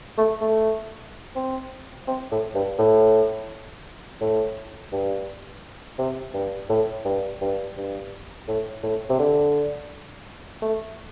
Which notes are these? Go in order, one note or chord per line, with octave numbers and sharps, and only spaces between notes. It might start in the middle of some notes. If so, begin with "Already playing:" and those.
A3
A3
C4
C4
A2
G2
A2
A2
G2
C3
G2
A2
G2
G2
G2
A2
A2
C3
D3
A3